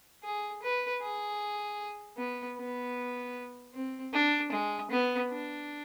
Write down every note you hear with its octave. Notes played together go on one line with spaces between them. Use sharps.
G#4
B4
G#4
B3
B3
C4
D4
G#3
B3
D4